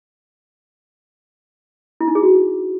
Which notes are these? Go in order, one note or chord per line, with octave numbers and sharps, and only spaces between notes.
E4
D#4
G#4
F#4